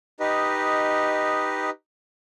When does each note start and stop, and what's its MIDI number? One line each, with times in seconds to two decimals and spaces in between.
0.20 1.70 63
0.20 1.70 67
0.20 1.70 71
0.20 1.70 75